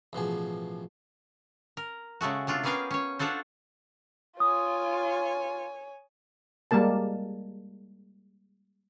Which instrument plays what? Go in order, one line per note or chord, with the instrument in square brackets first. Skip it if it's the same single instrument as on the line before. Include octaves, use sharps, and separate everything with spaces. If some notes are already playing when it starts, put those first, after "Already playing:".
[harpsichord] A1 B2 F3 G#4
[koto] A#4
C#3 G#3 A3 F#4
C3 A3 D4 F4
A#3 B3 C#4 G#4 F5 G5
C#4 C#5
D4 F4 F#4 A4 C5
[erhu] F4 [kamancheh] C#5 G#5 [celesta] D#6
[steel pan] G3 G#3 A#3 A#4 A5